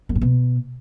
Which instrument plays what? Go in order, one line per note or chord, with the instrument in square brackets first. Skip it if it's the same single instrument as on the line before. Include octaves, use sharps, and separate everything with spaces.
[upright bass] F#2
A2
B2